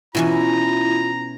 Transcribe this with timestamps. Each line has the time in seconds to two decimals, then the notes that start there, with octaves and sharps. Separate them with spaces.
0.15 B2 E3 C#4 E4 F4 A#5